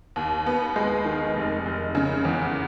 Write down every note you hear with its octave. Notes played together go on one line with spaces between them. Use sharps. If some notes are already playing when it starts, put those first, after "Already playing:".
D#2
B3
G#3
D#3
F1
F1
C#3
E2